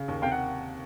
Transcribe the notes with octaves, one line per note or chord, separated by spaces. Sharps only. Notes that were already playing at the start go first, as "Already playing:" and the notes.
Already playing: C#3
D#2
C3 F5 G5
F#5